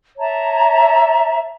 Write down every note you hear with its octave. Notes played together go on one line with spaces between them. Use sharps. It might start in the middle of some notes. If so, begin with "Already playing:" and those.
C#5 E5 A5 A#5